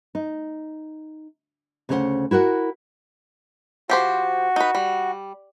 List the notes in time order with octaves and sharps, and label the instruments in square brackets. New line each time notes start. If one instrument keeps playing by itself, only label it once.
[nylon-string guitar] D#4
D2 C#3 C#4 D4 C5 F#5
E4 F#4 A#4 F#5
[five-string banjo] F3 G4 C5 [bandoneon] F#4
[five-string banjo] D#4 B4
G3